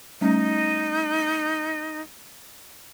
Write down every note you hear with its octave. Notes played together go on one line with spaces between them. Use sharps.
G3 A3 C#4 D#4